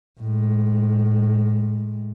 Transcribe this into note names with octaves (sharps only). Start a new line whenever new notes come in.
A2 G#3